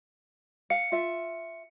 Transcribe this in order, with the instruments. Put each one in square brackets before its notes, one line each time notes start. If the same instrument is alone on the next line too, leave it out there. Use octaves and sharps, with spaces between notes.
[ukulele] F5 [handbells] C#7
[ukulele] F4 E5